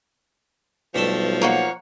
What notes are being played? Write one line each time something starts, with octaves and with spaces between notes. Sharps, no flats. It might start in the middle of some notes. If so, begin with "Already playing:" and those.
B1 G2 F3 A3 A4
A#3 C#5 F#5